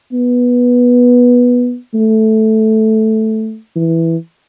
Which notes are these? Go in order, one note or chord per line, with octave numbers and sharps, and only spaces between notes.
B3
A3
E3